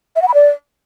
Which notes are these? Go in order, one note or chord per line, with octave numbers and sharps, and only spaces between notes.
E5
F#5
B5
D5